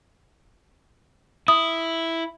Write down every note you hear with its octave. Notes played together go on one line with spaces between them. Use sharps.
E4 D#6